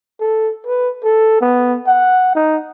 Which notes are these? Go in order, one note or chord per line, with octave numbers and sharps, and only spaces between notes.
A4
B4
A4
B3
F#5
D#4